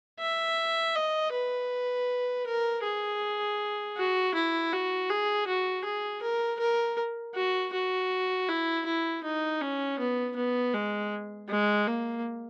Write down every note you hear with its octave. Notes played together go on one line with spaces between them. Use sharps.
E5
D#5
B4
A#4
G#4
F#4
E4
F#4
G#4
F#4
G#4
A#4
A#4
F#4
F#4
E4
E4
D#4
C#4
B3
B3
G#3
G#3
A#3